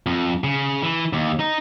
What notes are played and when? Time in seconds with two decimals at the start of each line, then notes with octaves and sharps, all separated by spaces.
0.06 F2
0.44 C#3
0.82 E3
1.13 D#2
1.40 D#4